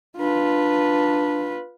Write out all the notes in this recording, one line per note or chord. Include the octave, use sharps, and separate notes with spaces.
D4 F4 B4